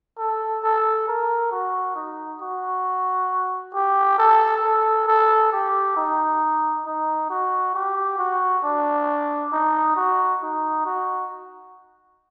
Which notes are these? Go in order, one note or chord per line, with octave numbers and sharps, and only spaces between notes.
A4
A4
A#4
F#4
D#4
F#4
G4
A4
A4
A4
G4
D#4
D#4
F#4
G4
F#4
D4
D#4
F#4
D#4
F#4